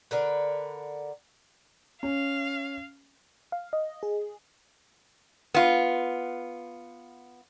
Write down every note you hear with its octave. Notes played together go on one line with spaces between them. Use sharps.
D3 A#4 B4
C#4 F5
F5
D#5
G#4
B3 F4